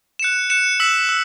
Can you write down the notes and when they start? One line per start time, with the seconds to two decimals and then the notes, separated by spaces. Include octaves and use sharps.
0.19 F#6 C#7 E7
0.50 F#6 C#7 E7
0.80 E6 B6 F#7
1.09 E6